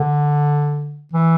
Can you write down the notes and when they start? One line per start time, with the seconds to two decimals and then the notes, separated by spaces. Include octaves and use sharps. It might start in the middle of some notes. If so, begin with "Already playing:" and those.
Already playing: D3
1.13 E3